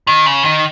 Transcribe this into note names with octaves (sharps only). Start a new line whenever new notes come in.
D#3
C#3
D#3